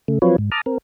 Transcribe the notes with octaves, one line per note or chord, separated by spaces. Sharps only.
C#3 A3
F3 F#3 C4 F4 B4 C#5
G#2
A5 A#5 D6 D#6 F6
C4 A#4